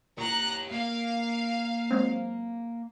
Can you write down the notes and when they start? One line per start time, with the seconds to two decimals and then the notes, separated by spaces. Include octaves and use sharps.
0.18 A#2 G4 C#5 A#5 F#6
0.72 A#3 F5
1.90 F#3 G#3 C4